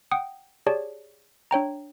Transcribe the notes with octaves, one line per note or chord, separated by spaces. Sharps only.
F#5 G5 D#6
G4 G#4 C#5 D5 A5
D4 C#5 G5 A#5